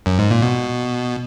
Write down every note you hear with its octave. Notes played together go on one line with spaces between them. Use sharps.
F#2
G#2
A#2
B2